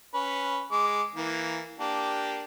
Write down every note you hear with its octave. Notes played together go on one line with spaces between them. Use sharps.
C#4 B4
G#3 D6
E3 A#3
A#3 D4 G4